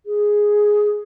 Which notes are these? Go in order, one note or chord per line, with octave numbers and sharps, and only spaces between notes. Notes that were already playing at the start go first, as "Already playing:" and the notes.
G#4